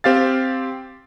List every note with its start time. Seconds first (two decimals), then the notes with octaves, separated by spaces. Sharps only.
0.04 C4 G4 F5 A6